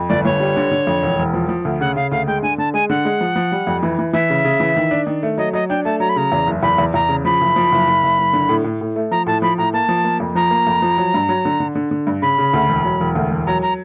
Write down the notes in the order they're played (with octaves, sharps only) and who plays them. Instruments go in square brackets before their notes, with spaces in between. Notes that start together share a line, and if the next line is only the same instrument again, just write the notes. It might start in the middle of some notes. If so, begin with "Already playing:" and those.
Already playing: [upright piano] F2
[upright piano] G1 [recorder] D5
[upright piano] G1 [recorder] C#5
[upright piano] G3
D3
D3
F2
E1
E1
F3
F3
D2
[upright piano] C#3 [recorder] F#5
[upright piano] C#3 [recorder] F5
[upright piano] D2 [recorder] F5
[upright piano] G#3 [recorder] G5
[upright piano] D3 [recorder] G#5
[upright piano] D3 [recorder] A5
[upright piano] G#3 [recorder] G#5
[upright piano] D3 [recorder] F#5
[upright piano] G#3
F3
F3
G3
F2
E3
E3
[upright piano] E3 [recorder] E5
[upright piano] C#3
C#3
E3
D#3
D4
D#3
A3
[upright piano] F#3 [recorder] D#5
[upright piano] F#3 [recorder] D#5
[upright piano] D4 [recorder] G5
[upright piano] A3 [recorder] A5
[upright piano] F#3 [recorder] A#5
[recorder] B5
[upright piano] C#3 [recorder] A#5
[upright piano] E2
F#1
[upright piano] E2 [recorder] B5
[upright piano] E2
[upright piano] E2 [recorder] A#5
[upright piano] C#3
[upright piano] F3 [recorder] B5
[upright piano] F#1
F3
F#1
F#1
F#1
F#1
D3
A2
A2
A2
A3
[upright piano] F3 [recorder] A#5
[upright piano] A2 [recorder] A5
[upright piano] F3 [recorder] B5
[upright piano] A2 [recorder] A#5
[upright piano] A#3 [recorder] A5
[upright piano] F3
A#3
F2
[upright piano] F3 [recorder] A#5
[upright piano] A#3
F2
F3
F#3
G2
F#3
D3
D3
D3
D3
G2
[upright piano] C#3 [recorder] B5
[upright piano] C#3
D2
E1
F#3
E1
D2
E1
[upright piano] F#3 [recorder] A#5
[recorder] A#5